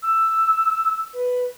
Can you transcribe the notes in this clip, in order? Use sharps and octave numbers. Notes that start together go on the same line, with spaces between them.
E6
B4